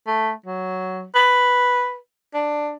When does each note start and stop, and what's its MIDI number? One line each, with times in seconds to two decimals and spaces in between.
0.07 0.33 57
0.46 1.04 54
1.15 1.96 71
2.34 2.75 62